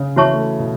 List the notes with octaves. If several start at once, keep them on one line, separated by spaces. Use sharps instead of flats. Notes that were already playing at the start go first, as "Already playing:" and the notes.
Already playing: C#3
E3 F#4 C#5 E5 A5 C#6
A3
B2